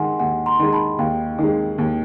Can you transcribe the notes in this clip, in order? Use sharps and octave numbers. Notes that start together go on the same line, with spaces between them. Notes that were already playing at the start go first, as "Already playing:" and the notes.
Already playing: D#3 G#3 F#5 G#5 C6
D#2 F#5 G#5
A#5 C6
D#3 G#3
A5 B5
D#2 F5 G5
D#3 G#3
D#2